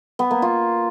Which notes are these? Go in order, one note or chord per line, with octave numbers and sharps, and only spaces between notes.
B3
A#3
F4